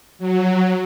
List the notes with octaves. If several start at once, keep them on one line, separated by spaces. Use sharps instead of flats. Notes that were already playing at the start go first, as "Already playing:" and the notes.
F#3